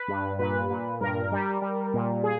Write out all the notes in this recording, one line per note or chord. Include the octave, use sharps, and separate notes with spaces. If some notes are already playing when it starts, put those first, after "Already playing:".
Already playing: B4
G2
A#2 B4
A#2
G2 A#4
G3
G3
A#2
G#4